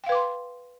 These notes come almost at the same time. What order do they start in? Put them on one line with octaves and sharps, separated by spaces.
G5 F5 B4 D6 C6